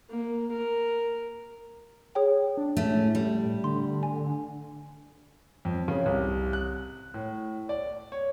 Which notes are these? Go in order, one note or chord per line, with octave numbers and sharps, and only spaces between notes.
A#3
A#4
G#4 C#5 G5
D4
A2 A3 C#4
G3
D3 C6
G#5
F2
C#3
C2
F#6
A2
D5
C#5